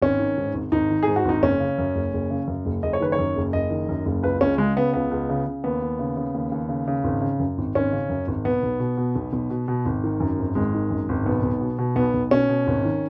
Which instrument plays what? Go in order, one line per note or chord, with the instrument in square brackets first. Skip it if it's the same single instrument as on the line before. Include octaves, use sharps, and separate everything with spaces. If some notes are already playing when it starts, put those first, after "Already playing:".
[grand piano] G#1 C#4
D#3
G#2
G#1
G#1 D#4
D#3
G#4
G#2
F#4
G#1 D#4
F#1 C#4
C#3
F#2
F#1
F#1
C#3
F#2
F#1
F#1 D#5
C#5
D#3 B4
C#5
F#2
F#1
F#1 D#5
D#3
F#2
F#1
C#2 B4
C#2 C#4
C#3 G#3
C#3 B3
C#2 B3
C#2
C#3
C#3
D#2 B3
D#2
C#3
C#3
D#2
D#2
C#3
C#3
G#1
C#3
F#2
G#1
G#1 C#4
C#3
F#2
G#1
B1 B3
B1
B2
B2
B1
B1
B2
B2
G#1
D#3
F#2
G#1
G#1 G#3
D#3
F#2
G#1
B1 B3
B1
B2
B2
B1 B3
B1
B2 C#4
B2
G#1
D#3